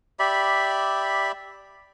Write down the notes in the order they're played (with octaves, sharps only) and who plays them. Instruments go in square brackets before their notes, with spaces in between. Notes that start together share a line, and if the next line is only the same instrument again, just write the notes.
[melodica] G4 D5 E5 B5